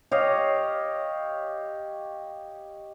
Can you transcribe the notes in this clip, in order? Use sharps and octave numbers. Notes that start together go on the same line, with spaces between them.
G4 C#5 D#5 F5